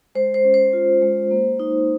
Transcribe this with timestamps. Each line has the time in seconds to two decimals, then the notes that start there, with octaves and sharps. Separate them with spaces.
0.15 G#3 C5
0.34 C5
0.44 C#4
0.54 C5
0.73 F4
1.02 G#3
1.31 A#3
1.60 D#4